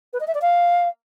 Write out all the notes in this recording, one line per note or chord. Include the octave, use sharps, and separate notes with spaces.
B4
D#5
E5
D5
F5